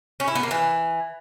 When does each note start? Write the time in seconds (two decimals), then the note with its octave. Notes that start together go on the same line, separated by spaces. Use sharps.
0.20 C#4
0.28 E4
0.35 B3
0.43 A#3
0.51 E3